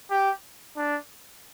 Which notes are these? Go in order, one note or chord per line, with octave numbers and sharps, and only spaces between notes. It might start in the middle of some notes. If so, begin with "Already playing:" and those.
G4
D4